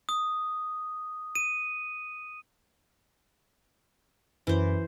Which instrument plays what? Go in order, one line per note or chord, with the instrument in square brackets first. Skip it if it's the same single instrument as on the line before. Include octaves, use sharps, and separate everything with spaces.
[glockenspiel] D#6
D#7
[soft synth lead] F#2 [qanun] E3 C5